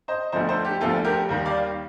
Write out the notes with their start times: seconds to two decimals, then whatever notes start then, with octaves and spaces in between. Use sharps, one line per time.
0.08 C5 D#5
0.32 D2 D3 F3 C5 D#5
0.48 A4 C5
0.65 G4
0.81 D2 D3 F3 F4 A4
1.04 G4 A#4
1.29 D#2 D#3 G3
1.45 D5 F5